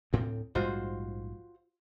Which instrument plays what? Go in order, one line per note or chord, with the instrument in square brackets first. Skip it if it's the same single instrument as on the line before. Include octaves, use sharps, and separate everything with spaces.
[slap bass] D2 A2 C4
[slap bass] A#1 G#2 G3 [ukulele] F4 F#4 C5